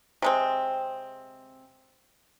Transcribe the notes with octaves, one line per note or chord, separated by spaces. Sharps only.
C3 G#3 C4